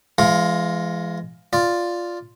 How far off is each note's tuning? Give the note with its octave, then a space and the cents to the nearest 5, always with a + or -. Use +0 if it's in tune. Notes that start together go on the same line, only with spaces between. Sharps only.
E3 +45 G#3 +10 F5 +20
F4 +0 D5 +0